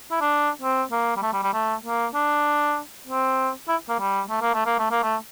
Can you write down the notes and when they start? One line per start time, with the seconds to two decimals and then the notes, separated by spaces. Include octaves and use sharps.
0.11 E4
0.21 D4
0.61 C4
0.91 A#3
1.16 G3
1.22 A3
1.33 G3
1.43 G3
1.53 A3
1.85 A#3
2.14 D4
3.07 C4
3.68 E4
3.89 A#3
3.99 G3
4.30 A3
4.41 A#3
4.54 A3
4.66 A#3
4.78 A3
4.91 A#3
5.03 A3